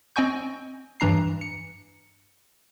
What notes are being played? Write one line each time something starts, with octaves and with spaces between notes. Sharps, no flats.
C4 D#5 G5 G#5 C#6 G6
G2 E3 D4 A#5 C7
C#7